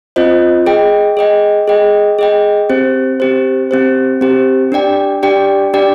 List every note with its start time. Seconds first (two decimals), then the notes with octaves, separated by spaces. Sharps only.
0.16 C4 F4 C5 D#5
0.66 G#4 D#5 G5
1.17 G#4 D#5 G5
1.68 G#4 D#5 G5
2.19 G#4 D#5 G5
2.69 C4 G4 C5
3.20 C4 G4 C5
3.71 C4 G4 C5
4.21 C4 G4 C5
4.72 D4 G4 D5 G5
5.23 D4 G4 D5 G5
5.74 D4 G4 D5 G5